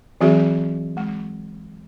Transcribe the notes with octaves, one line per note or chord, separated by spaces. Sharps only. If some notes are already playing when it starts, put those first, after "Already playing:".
E3 F#3 C4 F#4 G#4 E5
G#3